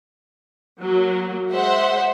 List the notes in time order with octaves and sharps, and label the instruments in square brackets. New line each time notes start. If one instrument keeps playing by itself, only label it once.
[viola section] F#3 A#3
[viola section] G#3 [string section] C5 E5 F#5